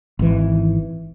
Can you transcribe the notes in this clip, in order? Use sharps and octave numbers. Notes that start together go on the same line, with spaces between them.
G#1 E3